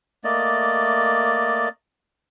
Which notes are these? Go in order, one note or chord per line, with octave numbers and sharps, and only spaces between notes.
A3 A#3 D5 D#5